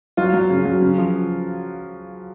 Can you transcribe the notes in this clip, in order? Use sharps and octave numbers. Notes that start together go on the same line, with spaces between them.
F#3 F4
F#3
C#3
F#3
C#3
F3